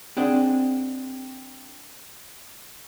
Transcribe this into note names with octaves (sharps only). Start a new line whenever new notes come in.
C4 D4 G#4 D#5 F#5